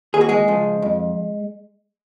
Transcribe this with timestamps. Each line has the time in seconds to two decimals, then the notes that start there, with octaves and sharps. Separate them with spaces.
0.14 D#2 G#4
0.21 F#4
0.29 G#3 G#4
0.48 C#3 F3
0.82 F2